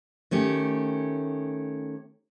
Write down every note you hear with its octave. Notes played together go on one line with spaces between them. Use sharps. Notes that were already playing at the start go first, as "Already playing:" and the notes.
D#3 A3 C#4 G4